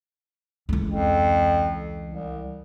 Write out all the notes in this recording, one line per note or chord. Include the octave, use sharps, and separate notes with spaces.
C#2 E3
F2
C2